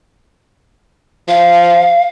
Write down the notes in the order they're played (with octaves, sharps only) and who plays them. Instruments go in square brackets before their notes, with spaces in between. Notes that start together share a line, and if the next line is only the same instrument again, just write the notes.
[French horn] F3 [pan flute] F5